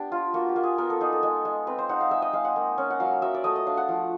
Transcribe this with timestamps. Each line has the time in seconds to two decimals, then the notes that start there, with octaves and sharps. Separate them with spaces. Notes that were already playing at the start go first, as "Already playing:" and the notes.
Already playing: B3 D4 G4
0.12 F4
0.34 A#3 F#4
0.49 G4
0.56 A#3
0.63 G#4
0.78 B3 A#4
0.90 A4
1.01 D#4 G#4
1.13 A4
1.23 G#3
1.45 G#3
1.67 C4 B4
1.78 C5
1.89 D#4 F#5
2.01 F5
2.11 G#3 E5
2.22 D#5
2.33 G#3 F5
2.45 F#5
2.56 A#3
2.78 C#4
2.90 F#5
3.00 F#3 F5
3.22 F#3 E5
3.34 D5
3.44 A3 D#5
3.56 D#5
3.66 D4 F5
3.77 F#5
3.88 F3